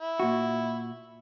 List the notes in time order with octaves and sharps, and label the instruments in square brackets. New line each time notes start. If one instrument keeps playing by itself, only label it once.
[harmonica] E4
[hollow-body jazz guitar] A#2 F#4